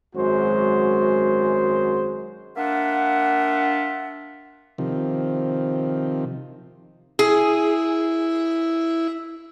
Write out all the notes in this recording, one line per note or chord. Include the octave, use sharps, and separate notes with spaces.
G#1 F#2 G#3 F#4 C5
A#3 D4 F4 E5 F#5
C3 D#3 F3
E4 G#4